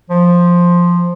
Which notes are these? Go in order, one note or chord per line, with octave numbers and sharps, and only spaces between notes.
F3